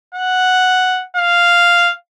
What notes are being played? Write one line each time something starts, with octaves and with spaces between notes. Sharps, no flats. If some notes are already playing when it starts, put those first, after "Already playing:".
F#5
F5